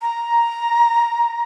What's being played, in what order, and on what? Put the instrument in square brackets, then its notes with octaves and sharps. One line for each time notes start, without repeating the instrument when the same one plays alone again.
[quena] A#5